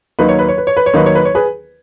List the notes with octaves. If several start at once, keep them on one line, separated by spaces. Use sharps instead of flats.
D#2 D#3 F#3 A#3 D#4 B4
C#5
B4
C#5
B4
C#5
B4
C#5
D#2 D#3 F#3 A#3 D#4 B4
C#5
B4
C#5
G#4 B4